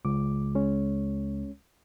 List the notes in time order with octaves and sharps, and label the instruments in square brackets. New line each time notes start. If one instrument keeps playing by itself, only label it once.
[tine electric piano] C#2 [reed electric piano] D6
[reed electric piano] G#3 C#4 C#5